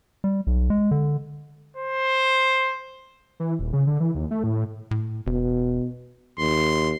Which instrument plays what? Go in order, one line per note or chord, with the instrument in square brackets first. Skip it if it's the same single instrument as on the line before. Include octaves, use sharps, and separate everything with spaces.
[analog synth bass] G3
B1
G#3
D3
[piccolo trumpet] C5
[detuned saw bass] E3
D#1
C#3
D3
E3
D#2
A3
A2
[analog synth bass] A2
[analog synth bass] E1 [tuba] B2
[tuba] D#2 [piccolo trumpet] C6